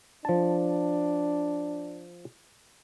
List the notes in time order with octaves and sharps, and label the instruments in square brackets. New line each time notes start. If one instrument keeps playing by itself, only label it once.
[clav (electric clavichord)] F3 A5 [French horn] D4